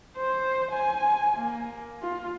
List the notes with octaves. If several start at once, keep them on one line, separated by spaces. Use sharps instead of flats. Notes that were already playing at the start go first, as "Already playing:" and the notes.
C5
G#5
A#3
F4